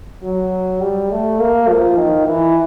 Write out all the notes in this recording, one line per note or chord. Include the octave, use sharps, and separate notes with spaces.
F#3
G3
A3
A#3
F3
D#3
E3